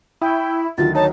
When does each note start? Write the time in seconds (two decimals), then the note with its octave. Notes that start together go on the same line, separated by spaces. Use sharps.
0.22 E4 G5 C#6 D#6
0.78 D2 D#3 F#3 F4 A6
0.95 D#4 C#5 A5